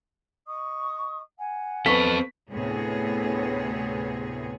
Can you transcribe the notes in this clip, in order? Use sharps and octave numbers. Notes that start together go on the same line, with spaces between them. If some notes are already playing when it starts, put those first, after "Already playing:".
D#5 C#6 D#6
F#5 G#5
B3 C4 A4 C#6 B6
D2 A2 C3 B3 G#4 C#5